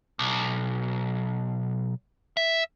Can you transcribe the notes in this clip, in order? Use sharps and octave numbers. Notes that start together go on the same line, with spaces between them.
B1
E5